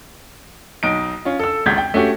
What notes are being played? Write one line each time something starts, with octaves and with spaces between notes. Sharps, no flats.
B1 D#4 D7
C#4 F4
A4 E6
G#1 C#2 G6 G#6 B6
G5
A3 C#4 F#4 G4